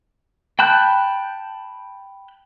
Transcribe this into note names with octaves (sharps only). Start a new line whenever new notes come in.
G5 A5 B5 F#6 G6